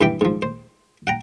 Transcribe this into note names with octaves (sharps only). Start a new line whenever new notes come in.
G2 E3 G4 G5
G#2 F3
C5
F#5 G5 A#5